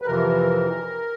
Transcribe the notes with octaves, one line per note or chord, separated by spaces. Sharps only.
B4
F2 C3 E3 A#4